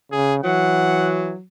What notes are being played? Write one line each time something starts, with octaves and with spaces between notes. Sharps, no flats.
C#3 G#4
E3 F#3 F#5